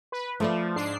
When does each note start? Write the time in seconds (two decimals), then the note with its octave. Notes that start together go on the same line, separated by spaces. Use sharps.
0.12 B4
0.40 F3 A3 F4 D5
0.76 G#2 D4 C7